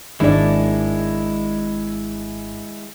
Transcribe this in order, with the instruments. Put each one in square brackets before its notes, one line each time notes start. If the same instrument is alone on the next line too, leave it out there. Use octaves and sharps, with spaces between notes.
[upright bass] G#1 [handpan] D#3 D4 D5 [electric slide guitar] G#3 E4